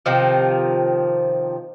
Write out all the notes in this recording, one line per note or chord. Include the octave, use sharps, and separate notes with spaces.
C3 D#3 F3